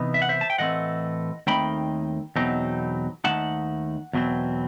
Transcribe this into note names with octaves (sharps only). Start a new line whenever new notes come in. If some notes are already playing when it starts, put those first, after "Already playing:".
Already playing: C3 E3 B3 D#4
E5
F#5
C5 E5
A5
G5
A2 E3 A3 C4 D#5 F#5
D#2 D#3 A3 C4 D#4 G5 B5
E2 B2 F#3 C4 D#4
D#2 D#3 A3 D#4 F#5 A5
E2 B2 F#3 C4